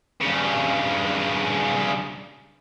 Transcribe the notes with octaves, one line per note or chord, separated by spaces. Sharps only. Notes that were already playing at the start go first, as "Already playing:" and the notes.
G2 C#3